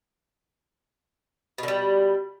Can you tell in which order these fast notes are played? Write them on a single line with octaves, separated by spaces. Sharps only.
B2 D3 G3